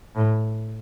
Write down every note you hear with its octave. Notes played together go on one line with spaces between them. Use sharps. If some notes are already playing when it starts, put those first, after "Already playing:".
A2